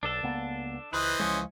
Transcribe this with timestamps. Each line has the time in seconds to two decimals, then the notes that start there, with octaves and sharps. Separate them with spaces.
0.03 B1 D4 A4
0.23 C#2 A#3 B3
0.93 C#2 E3 B4 C5 D#5
1.20 C#2 F3 G#3 C#4